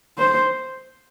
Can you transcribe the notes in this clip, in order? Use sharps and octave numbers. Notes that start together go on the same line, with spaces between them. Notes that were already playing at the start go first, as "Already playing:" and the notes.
C5